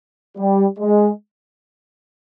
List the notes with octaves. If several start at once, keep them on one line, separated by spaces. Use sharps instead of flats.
G3
G#3